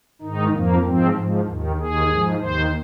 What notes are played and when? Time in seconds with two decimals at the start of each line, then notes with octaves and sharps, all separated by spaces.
0.22 G#2 D#3 D#4
0.53 F2 F3 A#3
0.84 G#2 F3 C4
1.16 G#2 F3
1.46 D#2 D#3
1.78 D#2 D#3 G#4
2.09 G#2 F3
2.40 D#2 D#3 C5